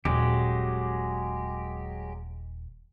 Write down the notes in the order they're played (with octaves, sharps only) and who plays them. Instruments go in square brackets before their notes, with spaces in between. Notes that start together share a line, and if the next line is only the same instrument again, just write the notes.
[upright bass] D#1 [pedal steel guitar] F#3 G#3 G4